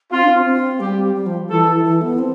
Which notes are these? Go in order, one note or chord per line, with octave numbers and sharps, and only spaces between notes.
C4 F4
D4
C4
C4
G3 G4
G3
F3
E3 A4
E3
B3
C4